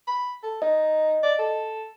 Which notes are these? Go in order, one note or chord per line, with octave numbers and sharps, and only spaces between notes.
B5
A4
D#4 D#5
D5
A4